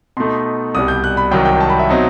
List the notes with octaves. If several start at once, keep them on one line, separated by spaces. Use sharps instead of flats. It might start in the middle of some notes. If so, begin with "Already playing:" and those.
B2 A3 D#4 C6
C2 B2 G3 D#6
G6
F#6
B5
C2 C3 D#3 F#3 G5
G5
A5
B5
E5
B2 F#3 C4 D#4